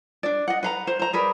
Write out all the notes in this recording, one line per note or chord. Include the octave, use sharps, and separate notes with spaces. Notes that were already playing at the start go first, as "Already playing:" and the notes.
D4 D5
D#5 F#5
B4 F5 A#5
C5
C5 A#5
G#4 A#4 B4 D5